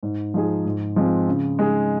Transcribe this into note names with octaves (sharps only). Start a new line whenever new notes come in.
G#2
F3 G#3 D#4 G#4
G#2
F3 G#3 C4
C#3
G#3 D#4 G#4